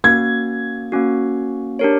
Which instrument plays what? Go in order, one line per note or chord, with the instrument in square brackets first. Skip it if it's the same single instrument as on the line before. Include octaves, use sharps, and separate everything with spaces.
[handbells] A#3 C#4 F#4 [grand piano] G#6
[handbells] A#3 C#4 F#4
D4 G4 A#4 C#5